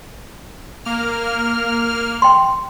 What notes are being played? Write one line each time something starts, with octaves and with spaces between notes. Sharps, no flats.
A#3 F6
G5 C6